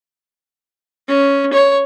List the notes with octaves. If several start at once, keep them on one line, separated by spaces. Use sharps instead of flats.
C#4
C#5